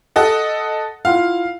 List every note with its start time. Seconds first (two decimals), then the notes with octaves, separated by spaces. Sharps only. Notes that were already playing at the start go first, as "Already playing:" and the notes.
0.16 A4 D#5 F#5
1.05 E4 F4 F5 F#5